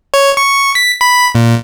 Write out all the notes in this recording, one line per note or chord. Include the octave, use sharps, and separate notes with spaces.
C#5
C#6
B6
B5
A#2